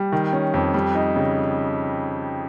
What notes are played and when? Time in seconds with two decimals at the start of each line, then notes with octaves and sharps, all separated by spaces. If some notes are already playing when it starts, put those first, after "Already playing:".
Already playing: G3
0.12 D#3
0.33 C#4
0.54 F2
0.74 G3
0.95 D#4
1.16 C#3